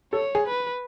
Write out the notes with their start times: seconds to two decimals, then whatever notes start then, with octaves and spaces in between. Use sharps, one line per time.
0.13 A4 C#5
0.35 G#4
0.47 B4